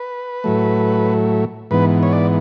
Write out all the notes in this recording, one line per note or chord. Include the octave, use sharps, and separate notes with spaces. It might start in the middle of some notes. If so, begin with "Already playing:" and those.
Already playing: B4
A2 F#3 A3
G#2 E3 B3 B4
C#5
D5